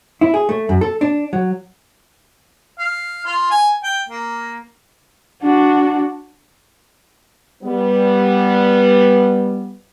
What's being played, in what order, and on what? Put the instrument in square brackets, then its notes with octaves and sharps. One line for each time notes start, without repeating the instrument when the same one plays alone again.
[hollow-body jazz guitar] E4
G#4
A3
F#2
A4
D4
F#3
[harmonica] F5
F4
G#5
G5
A#3
[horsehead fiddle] D4 F#4
[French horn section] G3 B3